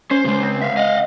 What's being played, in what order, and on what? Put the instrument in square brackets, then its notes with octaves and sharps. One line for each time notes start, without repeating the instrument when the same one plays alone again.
[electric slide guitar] C#4 [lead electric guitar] C5
[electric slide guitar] A2 C#3 G#3
[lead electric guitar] C4
E5 F5
[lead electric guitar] D#5 [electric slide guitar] F5 F#5